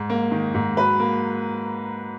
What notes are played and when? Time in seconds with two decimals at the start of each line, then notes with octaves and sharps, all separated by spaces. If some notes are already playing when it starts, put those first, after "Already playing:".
Already playing: G#2
0.10 A#3
0.31 D#3
0.54 G#2
0.76 F#3 B4
1.00 A#3